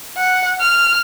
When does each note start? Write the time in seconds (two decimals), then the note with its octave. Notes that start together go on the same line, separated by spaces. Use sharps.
0.17 F#5
0.61 F6